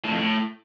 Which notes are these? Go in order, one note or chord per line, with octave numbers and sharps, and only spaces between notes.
A2
F2
A2